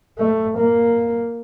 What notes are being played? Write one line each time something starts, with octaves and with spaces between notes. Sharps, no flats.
A3
A#3